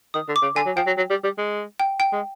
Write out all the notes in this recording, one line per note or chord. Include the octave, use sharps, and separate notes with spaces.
D#3 D#6
D3
D6
C#3
D3 G#5
F#3
F3 G5
F#3
F#3
G3
G3
G#3
G5
G5
G#3